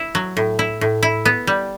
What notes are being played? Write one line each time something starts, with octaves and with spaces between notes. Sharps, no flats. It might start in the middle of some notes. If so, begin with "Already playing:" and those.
Already playing: E4
F#3
A2
E4
A2
E4
B3
G3